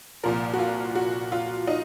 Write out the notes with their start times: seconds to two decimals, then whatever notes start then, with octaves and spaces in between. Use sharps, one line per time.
0.23 C2 A#2 F3 A#4
0.54 F#4
0.59 F4
0.96 F#4
1.32 F4
1.67 D#4